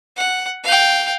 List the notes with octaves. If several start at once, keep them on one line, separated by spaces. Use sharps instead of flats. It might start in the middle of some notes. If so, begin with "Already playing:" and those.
F#5
F5 G5